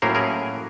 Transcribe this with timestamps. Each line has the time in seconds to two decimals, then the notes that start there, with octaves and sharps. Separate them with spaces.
0.02 A2 F#3 A#3 C#4 A#4 C5
0.15 G#4 A#4